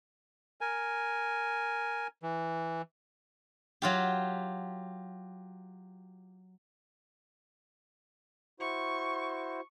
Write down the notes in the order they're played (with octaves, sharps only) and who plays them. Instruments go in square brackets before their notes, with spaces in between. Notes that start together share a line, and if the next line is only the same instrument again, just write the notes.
[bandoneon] A#4 G#5
E3
[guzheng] F#3 F4 G4
[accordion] E4 F#4 C5 [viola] C#6